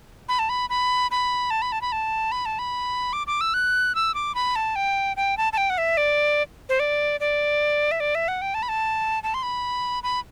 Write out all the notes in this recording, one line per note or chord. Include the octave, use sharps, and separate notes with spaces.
B5
A5
B5
B5
B5
A5
B5
A5
B5
A5
B5
A5
B5
D6
D6
E6
F#6
E6
D6
B5
A5
G5
G5
A5
A5
G5
F#5
E5
D5
C5
D5
D5
E5
D5
E5
F#5
G5
A5
B5
A5
A5
C6
B5
B5